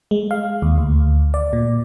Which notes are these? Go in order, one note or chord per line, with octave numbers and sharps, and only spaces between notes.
G#3
F5
D#2
D2
D5
A#2